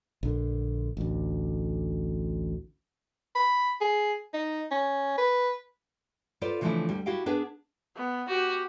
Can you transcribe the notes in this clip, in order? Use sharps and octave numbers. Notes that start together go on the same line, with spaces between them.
A#1 D3
A1 D2
B5
G#4
D#4
C#4
B4
F4 A4 B4 C5 D5
C#3 E3 F3 A3 D4 E4
D2 G3
E4 F#4 G4 F5 G5
B3 D4 G#4 B4
B3
F#4 G4